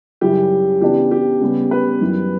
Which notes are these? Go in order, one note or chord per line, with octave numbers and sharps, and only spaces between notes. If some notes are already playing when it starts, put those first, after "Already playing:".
F#2 C#3 G3 C#4 E4 G4
C#3 E3 B3 D4 G4
G4
C#3 G3 B3
B4
F#2 E3 G3